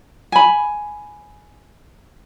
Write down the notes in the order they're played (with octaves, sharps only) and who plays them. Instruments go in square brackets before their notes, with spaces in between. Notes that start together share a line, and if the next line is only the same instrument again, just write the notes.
[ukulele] G#5 B5